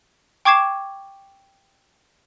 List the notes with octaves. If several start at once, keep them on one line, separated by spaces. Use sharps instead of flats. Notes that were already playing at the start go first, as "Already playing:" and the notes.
G5 C#6 D6 G#6 C7 E7